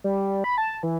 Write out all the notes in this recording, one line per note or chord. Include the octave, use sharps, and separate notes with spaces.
G3
B5
A5
E3